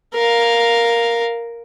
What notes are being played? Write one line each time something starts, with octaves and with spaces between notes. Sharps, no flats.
A#4 F5